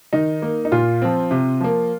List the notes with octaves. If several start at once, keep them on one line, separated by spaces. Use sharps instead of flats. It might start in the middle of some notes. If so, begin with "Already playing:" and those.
D#3 D#4
A#3
D#4
A#2 F4
F3 C4
C3
F3 A#3